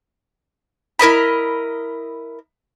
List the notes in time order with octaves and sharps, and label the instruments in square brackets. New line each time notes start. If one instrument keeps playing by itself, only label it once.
[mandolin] E4 A#4 D#5 B5